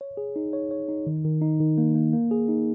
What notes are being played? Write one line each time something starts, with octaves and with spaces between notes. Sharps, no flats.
C#5
G#4
D#4
C#5
C#5
D#4
D#3
D#3
D#4
D#3
A#3
A#3
A#3
G#4
D#4